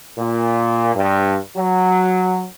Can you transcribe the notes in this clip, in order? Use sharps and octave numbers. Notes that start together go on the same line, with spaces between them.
A#2
G2
F#3